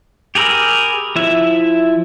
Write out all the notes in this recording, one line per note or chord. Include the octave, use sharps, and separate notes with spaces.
G4 G#4 A#4 B5 E6
F3 E4 E5